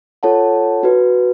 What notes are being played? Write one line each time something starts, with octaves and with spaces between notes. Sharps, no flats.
F4 A4 C#5 F#5 A5
D#4 F#4 B4